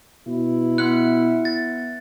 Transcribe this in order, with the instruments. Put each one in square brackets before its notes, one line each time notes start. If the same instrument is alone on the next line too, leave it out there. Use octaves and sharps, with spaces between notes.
[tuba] B2 [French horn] E4
[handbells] B3 E5 C#7 [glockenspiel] F#6
[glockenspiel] A6